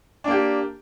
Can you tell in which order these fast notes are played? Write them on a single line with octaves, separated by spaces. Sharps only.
D4 A#3 G4